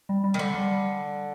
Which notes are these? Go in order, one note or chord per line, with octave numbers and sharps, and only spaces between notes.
G3
G3
D#3
D3 G3
G3